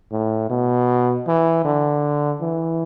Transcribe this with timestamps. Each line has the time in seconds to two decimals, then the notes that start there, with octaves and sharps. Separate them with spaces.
0.12 A2
0.50 B2
1.27 E3
1.65 D3
2.42 E3